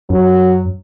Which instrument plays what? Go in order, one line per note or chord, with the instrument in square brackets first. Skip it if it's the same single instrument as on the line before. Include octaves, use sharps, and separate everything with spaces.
[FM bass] F#2 [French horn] F#3